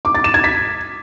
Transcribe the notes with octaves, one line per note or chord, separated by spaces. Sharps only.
D6
A6
E7
G#6
B6